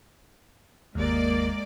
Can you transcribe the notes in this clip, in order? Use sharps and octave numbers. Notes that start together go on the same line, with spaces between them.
G1 D#2 G#3 A#3 D5